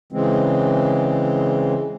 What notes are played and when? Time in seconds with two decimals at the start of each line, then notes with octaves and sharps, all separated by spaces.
0.13 C#3 E3 G#3 C4